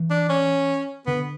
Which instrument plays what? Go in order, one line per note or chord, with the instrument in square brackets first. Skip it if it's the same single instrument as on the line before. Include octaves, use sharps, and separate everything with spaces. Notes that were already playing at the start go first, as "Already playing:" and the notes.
Already playing: [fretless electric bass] E3
[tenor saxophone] D4
C#4
[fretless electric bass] D3 [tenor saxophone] B3